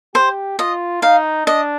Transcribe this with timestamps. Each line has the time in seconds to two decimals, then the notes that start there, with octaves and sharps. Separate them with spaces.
0.15 G4 C5
0.59 F4 D#5
1.02 D#4 F5
1.46 D4 D#5